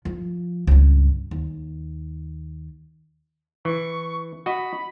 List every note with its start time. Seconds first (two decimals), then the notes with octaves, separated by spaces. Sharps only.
0.05 F3
0.67 C#2 G2
1.31 D#2
3.65 E3 C#6
4.46 F#4 D#5 B5